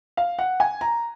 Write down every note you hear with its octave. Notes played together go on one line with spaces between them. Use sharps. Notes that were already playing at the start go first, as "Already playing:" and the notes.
F5
F#5
G#5
A#5